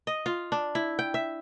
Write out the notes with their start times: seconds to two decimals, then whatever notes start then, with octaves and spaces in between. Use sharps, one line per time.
0.07 D#5
0.26 F4
0.52 D4
0.75 E4
0.99 G5
1.14 E5